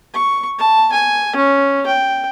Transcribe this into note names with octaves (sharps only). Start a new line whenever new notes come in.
C#6
A5
G#5
C#4
G5